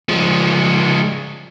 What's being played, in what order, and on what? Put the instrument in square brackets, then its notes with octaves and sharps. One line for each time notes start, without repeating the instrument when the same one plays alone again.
[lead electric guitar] F3 G#3